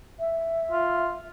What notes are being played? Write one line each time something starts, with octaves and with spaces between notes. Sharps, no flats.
E5
F4